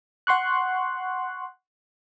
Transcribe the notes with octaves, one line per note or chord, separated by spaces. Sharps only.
F#5 C6 C#6 F#6